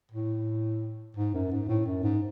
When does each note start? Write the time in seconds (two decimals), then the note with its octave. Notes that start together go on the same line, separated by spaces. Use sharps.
0.12 A2
1.16 G#2
1.34 F#2
1.52 G#2
1.69 A2
1.86 F#2
2.04 G#2